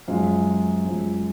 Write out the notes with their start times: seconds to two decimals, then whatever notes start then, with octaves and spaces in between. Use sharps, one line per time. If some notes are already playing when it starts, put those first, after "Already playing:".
0.08 F#2 F3 G#3 F5
0.85 F#2 F3 G#3